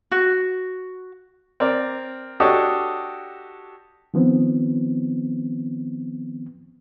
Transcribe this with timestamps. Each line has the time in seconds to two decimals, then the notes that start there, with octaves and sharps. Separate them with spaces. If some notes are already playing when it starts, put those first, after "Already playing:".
0.12 F#4
1.60 C4 A#4 D5
2.40 D4 F#4 G4 A4 C#5 D#5
4.14 D#3 F3 B3 C4